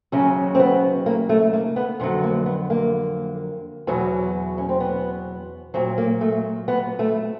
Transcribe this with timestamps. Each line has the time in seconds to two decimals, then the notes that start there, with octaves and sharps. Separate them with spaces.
0.12 D#2 C#3 F#3 C#4
0.55 C4
0.59 B3
1.06 A#3
1.29 A3
1.53 A#3
1.76 B3
2.00 F2 D3 F#3 B3
2.23 A#3
2.46 B3
2.70 A#3
3.87 E2 B2 F#3
4.58 C#4
4.69 C4
4.80 B3
5.74 A#2 F#3 C4
5.98 A#3
6.21 A3
6.68 B3
6.99 A3